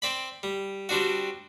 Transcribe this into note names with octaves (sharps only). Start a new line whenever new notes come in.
C4 D5 B5
G3
G3 C4 D4 F#4